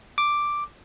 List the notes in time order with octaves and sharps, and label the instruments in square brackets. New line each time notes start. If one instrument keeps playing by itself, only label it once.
[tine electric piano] D6